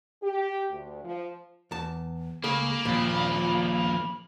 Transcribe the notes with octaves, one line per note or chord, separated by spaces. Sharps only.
G4
D2
F3
E2 A5
C#2 A3 A#3 G#4 B5
D#2 A#2 F3